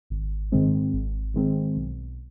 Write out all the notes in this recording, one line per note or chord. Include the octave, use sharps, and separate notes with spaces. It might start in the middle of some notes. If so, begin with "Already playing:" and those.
G#1
G#2 D#3 G#3 C4
G#1
G#2 D#3 G#3 C4
B1